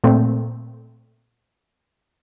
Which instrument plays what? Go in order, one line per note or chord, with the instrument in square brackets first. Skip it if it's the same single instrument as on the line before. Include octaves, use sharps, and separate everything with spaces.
[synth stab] A#2 A3 C4